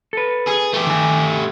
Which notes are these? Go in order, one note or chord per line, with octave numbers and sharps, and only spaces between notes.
A4 B4
G#4
A3 G4
D#3 G#5